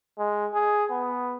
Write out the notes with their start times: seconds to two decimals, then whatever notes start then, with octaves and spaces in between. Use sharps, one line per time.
0.18 G#3
0.54 G#4
0.91 B3